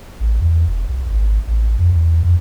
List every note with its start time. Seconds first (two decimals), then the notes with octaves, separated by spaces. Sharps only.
0.20 A1
0.40 E2
0.68 F1
0.89 C2
1.10 G#1
1.48 A1
1.79 F2
1.92 E2
2.23 F2